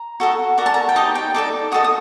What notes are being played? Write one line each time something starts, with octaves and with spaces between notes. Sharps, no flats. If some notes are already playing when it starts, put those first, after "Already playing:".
Already playing: A#5
F#4 A4 D#5
F#4 A#4 D5 A#5
A5
A#5
G5
D#4 G4 C5 D#5 A5
G5
D#4 A4 D5 D6
F#4 A4 D#5 D#6
D#6